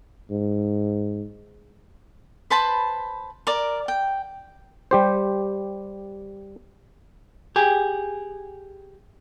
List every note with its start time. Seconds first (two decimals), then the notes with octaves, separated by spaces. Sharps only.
0.31 G#2
2.50 B4 C5 A5 B5
3.47 A#4 D5
3.88 G5
4.91 G3 G4 C5
7.56 G4 G#4